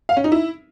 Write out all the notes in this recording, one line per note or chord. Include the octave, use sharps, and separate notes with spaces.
F5
C#4
D#4
E4